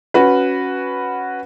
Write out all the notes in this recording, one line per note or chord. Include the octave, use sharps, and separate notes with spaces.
C#4 F#4 B4